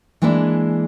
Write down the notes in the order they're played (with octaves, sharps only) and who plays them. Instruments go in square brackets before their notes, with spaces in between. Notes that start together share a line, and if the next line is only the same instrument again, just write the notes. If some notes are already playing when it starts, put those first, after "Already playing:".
[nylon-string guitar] E3 G#3 A#3 D4 E4